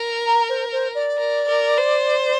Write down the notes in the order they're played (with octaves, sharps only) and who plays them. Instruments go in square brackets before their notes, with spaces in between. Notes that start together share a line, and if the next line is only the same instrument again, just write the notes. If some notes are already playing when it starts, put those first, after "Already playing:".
Already playing: [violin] A#4
[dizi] A#5
C5
C5
D5
[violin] A#4
A#4
C5